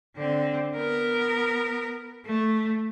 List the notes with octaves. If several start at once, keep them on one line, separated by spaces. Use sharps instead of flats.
D3 C4
B3 A#4
A3